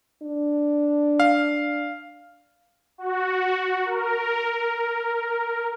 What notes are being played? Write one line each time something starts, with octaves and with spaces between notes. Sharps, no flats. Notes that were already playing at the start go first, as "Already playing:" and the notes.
D4
F5
F#4
A#4